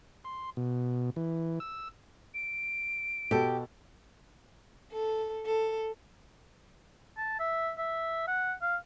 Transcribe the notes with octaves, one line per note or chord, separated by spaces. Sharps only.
C6
B2
E3
E6
D7
B2 G4 A4
A4
A4
A5
E5
E5
F#5
F5